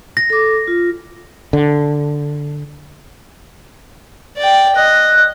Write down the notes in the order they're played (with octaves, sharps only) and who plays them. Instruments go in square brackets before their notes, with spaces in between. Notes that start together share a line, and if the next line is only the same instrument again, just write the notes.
[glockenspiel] A#6
[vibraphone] A4 D6
F4
[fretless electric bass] D3
[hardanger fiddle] D5 G5
[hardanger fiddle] D#5 [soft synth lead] F#6